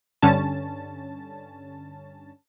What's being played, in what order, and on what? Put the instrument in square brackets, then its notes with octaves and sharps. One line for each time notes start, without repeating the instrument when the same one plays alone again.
[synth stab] G2 D3 C#4 A5